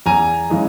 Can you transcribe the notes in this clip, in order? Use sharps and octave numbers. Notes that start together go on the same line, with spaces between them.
E2 G#5 A#5
C#3 E3 G#3